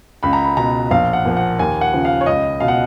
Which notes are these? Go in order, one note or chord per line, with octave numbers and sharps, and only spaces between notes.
C#2 B5
A#5
B5
B2 A#5
A#1 F5
F#5
A#2 F3
F#5
D#2 G#5
F#5
C#3 F3
F5
C#5
C#2 D#5
B2 F5
F#5